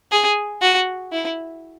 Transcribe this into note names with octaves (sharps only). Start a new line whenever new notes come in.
G#4
F#4
E4